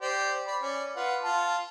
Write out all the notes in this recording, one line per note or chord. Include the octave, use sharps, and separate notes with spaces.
G4 C5 D5
D5 B5
C#4 D5
F4 B4 F#5
F4 A5